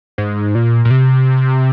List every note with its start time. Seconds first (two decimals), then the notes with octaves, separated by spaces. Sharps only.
0.18 G#2
0.55 A#2
0.85 A#2
0.90 C3